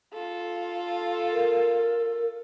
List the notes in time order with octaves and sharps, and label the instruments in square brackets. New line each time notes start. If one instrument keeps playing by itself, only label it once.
[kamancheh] F4 A4
[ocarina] A#4